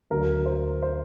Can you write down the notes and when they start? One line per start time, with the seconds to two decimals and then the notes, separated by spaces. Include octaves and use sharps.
0.10 D2 D3 F#3 A#4
0.46 C5
0.82 C5